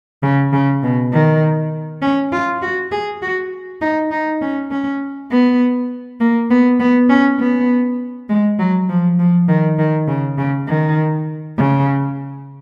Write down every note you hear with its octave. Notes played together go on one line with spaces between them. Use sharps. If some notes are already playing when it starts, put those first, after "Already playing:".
C#3
C#3
B2
D#3
C#4
F4
F#4
G#4
F#4
D#4
D#4
C#4
C#4
B3
A#3
B3
B3
C#4
B3
G#3
F#3
F3
F3
D#3
D#3
C#3
C#3
D#3
C#3